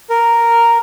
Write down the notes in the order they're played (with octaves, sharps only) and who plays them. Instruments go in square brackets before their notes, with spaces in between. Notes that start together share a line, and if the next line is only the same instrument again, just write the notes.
[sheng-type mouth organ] A#4